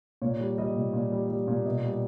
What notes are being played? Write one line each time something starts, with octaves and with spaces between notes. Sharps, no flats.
A#2 C#5
G3
G3 D#5
A#2
A#2
G3
G3
A#2
B2 D#5
G3